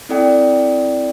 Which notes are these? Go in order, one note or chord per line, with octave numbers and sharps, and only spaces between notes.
C4 E4 A4 D5 G5